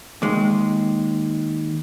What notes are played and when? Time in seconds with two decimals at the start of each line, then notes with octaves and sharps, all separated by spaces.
0.22 D#2 G#3